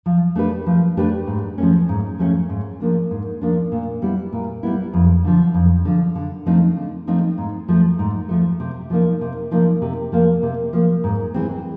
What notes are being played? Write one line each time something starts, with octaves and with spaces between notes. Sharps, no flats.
F3
A3 D4 G4 B4
F3
A3 D4 G4 B4
G#2
F3 A3 C#4
G#2
F3 A3 C#4
G#2
F3 A#3 D4
G#2
F3 A#3 D4
A#2
G3 B3 E4
A#2
G3 B3 E4
F2
D3 F3
F2
D3 F3
D3
F3 A3 C4 D#4
D3
F3 A3 C4 D#4
G#2
F3 A3
G#2
F3 A3
C3
F3 A#3 D#4
C3
F3 A#3 D#4
C3
F3 A#3
C3
F3 A#3
G#2
E3 G#3 C4